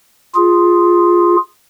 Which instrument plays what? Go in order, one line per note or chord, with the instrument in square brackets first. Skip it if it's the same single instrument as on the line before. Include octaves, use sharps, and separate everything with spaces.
[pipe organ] F4 G#4